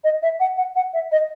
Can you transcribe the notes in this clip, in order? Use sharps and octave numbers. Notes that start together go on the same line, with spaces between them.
D#5
E5
F#5
F#5
F#5
E5
D#5